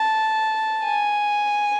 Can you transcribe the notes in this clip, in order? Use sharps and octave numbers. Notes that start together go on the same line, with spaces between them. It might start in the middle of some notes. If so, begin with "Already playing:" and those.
Already playing: A5
G#5